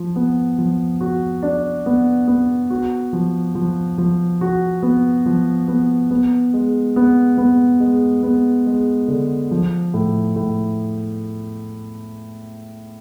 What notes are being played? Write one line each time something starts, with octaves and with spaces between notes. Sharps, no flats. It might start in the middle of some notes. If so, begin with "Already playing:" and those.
Already playing: F3
B3
F3
F#4
D4
B3
B3
F#4
F3
F3
F3
F#4
B3
F3
B3
B3
G#3
B3
B3
G#3
B3
G#3
D3
F3
A2
A2